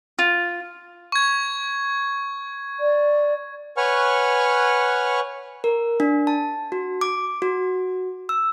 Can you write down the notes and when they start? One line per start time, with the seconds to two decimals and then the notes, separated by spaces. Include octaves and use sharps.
0.19 F4
1.12 C#6 G#6
2.80 D5
3.77 B4 C#5 F#5 G#5 C#6 F6
5.64 A#4
6.00 D4
6.27 A5
6.72 F#4
7.01 D6
7.42 F#4
8.29 E6